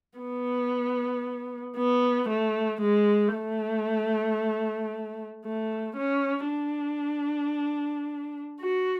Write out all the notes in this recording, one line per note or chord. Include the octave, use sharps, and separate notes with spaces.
B3
B3
A3
G#3
A3
A3
C#4
D4
F#4